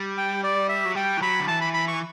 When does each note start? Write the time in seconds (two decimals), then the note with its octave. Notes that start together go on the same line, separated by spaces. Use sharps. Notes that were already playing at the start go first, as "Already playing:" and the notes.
Already playing: G3
0.18 G5
0.43 D5
0.69 E5
0.85 F#3
0.95 G3 G5
1.17 E3
1.21 F#3 B5
1.40 D3
1.48 E3 A5
1.61 B5
1.74 B5
1.88 C#6